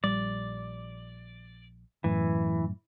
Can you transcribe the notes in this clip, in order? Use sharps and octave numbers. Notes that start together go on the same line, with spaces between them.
A#1 G3 D5
F#2 A2 E3